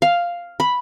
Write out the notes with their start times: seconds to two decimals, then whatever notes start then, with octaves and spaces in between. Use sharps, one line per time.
0.02 F5
0.60 B5